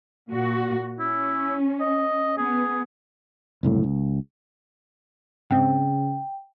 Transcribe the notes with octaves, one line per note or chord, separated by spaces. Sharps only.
A#2 F#4
C#4 E4
D#5
B3 G#4
F#1 C2 A2
C#2
G#2 C#3 C4 G5